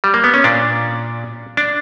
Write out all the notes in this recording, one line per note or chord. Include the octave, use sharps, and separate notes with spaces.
G3
A#3
B3
C#4
A#2 D4
D4